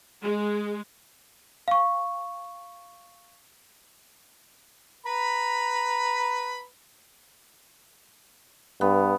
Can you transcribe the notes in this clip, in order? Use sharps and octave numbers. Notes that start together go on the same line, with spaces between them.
G#3
F5 C#6
B4 A#5 B5
G2 B3